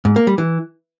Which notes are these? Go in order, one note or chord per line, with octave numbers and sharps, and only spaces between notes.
G#2
A#3
G3
E3